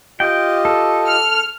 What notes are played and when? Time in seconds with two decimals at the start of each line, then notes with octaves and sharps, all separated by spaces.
0.20 F4 G4 D#5 G5
0.65 A4
1.09 F6